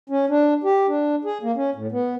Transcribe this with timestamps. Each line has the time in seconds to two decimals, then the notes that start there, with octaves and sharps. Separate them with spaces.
0.10 C#4
0.29 D4
0.64 G4
0.88 D4
1.25 G#4
1.43 A#3
1.56 C#4
1.75 A2
1.92 B3